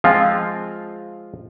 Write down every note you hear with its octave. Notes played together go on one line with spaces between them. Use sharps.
F3 G#3 C4 F4